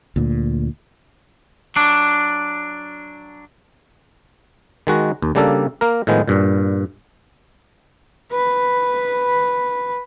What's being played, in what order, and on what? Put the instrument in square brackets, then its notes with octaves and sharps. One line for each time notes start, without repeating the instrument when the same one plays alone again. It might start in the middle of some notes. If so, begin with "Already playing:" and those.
[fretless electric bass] D2 A#2
[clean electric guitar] F#3 D4
[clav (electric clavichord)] D#3 G#3 F#4
D#2
C#3 G3 A#3 D4 A4
A#3 A#4
A2 D#3 F3 G#3 B3
G2 A#2
[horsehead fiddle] B4 B5